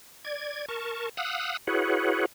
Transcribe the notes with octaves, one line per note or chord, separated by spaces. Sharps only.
D5 G#6
A#4 A5 C#6
F5 F#5 D#6 E6 F#6
E4 F#4 G#4 B4 C#5 F#5